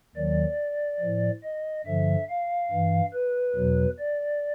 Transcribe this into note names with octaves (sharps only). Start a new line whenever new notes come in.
D#2 D#3 F#3 D5
A2 F3
D#5
G2 D3 F3 E5
F5
G2 E3
B4
E2 B2 F#3
D5